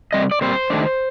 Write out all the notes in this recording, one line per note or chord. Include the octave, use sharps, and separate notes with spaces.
C3 G3 C4 D#5
D5
A#2 G3 C4 C5
D#3 A3 D4